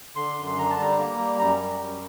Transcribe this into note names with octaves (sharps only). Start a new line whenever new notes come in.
D3 C6
F#2
C6
D3 A#5
A5
G3 A#5
A#3
G3
F#2 A#5
G3
F#2